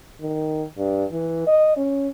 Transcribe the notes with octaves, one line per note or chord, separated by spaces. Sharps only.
D#3
G2
E3
D#5
C#4